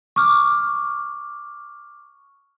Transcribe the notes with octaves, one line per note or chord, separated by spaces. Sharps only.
C#6 D6 F6